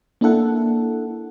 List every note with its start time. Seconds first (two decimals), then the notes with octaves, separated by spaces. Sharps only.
0.21 A#3 D4 E4 A4 F#5